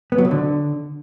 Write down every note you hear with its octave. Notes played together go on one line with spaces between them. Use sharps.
B3
F#3
B2
D3